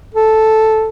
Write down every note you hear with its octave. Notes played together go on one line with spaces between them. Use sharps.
A4